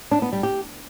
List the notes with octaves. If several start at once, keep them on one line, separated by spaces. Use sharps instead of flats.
D4
B3
G3
G4